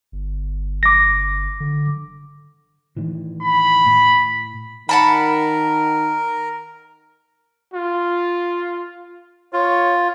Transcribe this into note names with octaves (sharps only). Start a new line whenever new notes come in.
G1
D6 A#6
D3
A2 D#3 E3
B5
A2
D#3 A#4 F#5 A5 B5
F4
F4 C#5